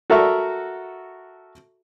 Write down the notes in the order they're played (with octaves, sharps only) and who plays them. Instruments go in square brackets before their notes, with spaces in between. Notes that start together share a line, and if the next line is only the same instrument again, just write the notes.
[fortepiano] F#4 A4 A#4 E5 C#6